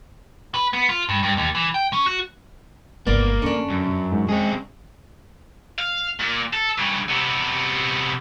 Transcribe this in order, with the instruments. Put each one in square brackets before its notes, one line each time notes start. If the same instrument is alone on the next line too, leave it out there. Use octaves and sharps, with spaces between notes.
[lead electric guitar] B4
B3
F4
G2
G2
D#2
E3
G5
C#4
F#4
[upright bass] G1 C#2 [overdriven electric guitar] A#3 [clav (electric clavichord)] B3 [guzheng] D5
[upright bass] F2 [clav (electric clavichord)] D3 [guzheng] C#4 D4
[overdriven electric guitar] F#2
[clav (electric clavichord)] G#2
[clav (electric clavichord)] G#3 [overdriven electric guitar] C4 G#4
[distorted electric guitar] F5
A#2
A4
G2 C#3
C3 B3